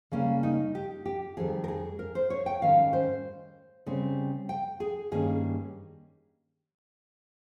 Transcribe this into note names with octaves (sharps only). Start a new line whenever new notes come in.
C#3 G3 A#3 C#4
D#4
G4
G4
F2 D#3 G3 C4 G#4
A#4
G#4
A#4
C5
C#5
G5
G#2 D#3 G3 C#4 F5
C5
C#3 G3 C4
G5
G#4
G2 D#3 G3 A#3 C#4 G#4